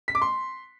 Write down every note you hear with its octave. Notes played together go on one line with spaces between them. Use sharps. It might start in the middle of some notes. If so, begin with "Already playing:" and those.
B6
D6
C6